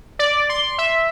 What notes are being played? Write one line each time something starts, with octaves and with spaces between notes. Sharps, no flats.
D5
C6
E5